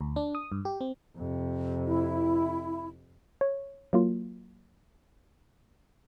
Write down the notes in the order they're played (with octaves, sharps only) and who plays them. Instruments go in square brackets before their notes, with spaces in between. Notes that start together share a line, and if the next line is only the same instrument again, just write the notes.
[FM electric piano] D2
D4
D#6
G2
G4
C4
[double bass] F2 C3
[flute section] E4
[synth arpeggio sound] C#5
F#3 A#3 F4